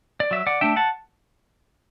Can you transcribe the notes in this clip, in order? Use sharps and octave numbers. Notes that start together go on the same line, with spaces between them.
D5
F#3 E5
D5 F#5
A3 D4 E5 G5
F#5 A5